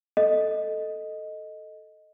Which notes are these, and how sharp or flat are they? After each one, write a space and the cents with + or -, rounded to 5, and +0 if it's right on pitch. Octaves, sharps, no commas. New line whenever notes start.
A4 +0 D#5 +0